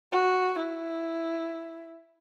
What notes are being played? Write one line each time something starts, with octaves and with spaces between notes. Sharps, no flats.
F#4
E4